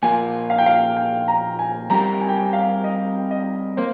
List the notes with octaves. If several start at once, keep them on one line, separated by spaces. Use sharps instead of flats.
A#2 F3 A#3 F4 A#4 G#5
F5
G5
F5
G5
A#5
G#5
G3 C4 G4 A#4 A#5
G#5
G5
G#5
F5
D#5
D#5
A#3 C5